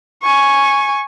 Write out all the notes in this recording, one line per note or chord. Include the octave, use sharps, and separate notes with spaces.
G#5 C#6